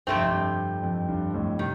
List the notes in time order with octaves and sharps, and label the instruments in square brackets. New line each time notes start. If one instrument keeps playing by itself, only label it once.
[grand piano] G2 [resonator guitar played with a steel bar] C3 F3 A3 C4
[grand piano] F2
G2
F2
G2
F2 A2
[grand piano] C3 [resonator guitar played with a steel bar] D#3